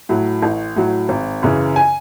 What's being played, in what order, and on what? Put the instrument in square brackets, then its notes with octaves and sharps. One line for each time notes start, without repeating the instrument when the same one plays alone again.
[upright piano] A2 F#3
A1
A2 F#3
G#1
F#2 C#3 E3
G#5